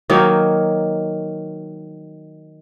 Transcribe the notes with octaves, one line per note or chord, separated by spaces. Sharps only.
D#3 F#3 A#3 D#4